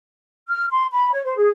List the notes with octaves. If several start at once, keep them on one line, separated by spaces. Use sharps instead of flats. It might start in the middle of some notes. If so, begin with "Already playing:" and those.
F6
C6
B5
C#5
C5
G#4